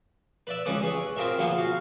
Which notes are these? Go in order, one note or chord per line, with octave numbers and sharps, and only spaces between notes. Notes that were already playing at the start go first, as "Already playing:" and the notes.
B4 D5 E5
C#2 E3 C#4 B4 D6 D#6
G#4 B4 C#5
C4 F4 G#4 A#4 E5
C#3 F3 A#3 B3 F4 G#4
F#4 F5